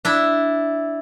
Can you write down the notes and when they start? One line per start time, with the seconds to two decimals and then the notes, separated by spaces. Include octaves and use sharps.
0.05 D4 E4